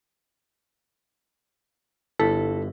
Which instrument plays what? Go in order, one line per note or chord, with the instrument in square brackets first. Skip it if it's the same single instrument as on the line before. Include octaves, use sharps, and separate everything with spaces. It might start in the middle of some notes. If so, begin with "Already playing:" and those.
[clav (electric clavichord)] G1 [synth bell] E4 [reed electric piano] A4